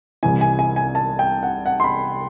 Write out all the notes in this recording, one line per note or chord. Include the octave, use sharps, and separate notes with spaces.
C2 C3 E3 G#5
G#5
G#5
G#5
A5
G5
F#5
F#5
C6
B5